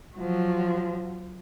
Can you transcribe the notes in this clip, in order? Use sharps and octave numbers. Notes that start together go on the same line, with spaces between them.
F3 F#3